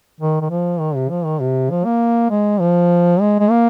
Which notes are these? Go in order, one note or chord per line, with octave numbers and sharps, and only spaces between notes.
D#3
D#3
F3
D#3
C3
F3
D#3
C3
F3
A#3
G#3
F3
G#3
G#3
A#3